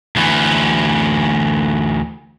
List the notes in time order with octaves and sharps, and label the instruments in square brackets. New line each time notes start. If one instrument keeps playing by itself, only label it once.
[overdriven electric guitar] D2 E3